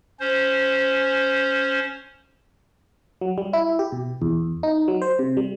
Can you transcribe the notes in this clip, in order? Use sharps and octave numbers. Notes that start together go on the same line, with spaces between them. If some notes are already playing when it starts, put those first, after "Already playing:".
C#4 C5
F#3
G3
E4
G4
B2
E2
D#4
F#3
C5
C3
G3